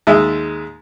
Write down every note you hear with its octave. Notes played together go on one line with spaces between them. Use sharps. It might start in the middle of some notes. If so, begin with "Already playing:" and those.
D#2 G#3 E5